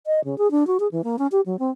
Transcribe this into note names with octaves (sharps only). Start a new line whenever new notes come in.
D#5
C#3
G#4
D4
F#4
G#4
E3
A#3
C#4
G4
F#3
C4